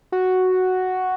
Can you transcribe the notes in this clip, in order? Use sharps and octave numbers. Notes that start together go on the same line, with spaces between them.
F#4